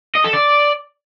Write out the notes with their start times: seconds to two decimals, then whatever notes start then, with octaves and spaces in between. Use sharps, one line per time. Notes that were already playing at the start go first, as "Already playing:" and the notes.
0.15 D#5
0.24 A4
0.33 D5